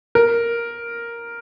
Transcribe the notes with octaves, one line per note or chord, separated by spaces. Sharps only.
A#4